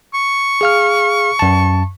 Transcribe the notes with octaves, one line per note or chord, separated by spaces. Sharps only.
C#6
G#4 F5 F6
F#2 A5